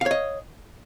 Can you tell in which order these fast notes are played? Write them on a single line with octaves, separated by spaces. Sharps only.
F5 C#5 D#5